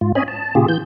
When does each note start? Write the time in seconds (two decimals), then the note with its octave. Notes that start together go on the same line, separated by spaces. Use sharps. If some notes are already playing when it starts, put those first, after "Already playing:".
0.01 G#2 F4
0.15 C4 C#4 C#5 D#5 G#5 B5
0.28 A5
0.55 A#2 C#3 F4 G4 G#4
0.68 E3 G6